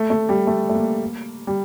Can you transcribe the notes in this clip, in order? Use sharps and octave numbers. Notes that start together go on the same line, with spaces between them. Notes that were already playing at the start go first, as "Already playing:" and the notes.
Already playing: A3
A3
G3
A3
A3
A#3
G3